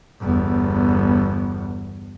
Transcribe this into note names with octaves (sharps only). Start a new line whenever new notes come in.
G1 E2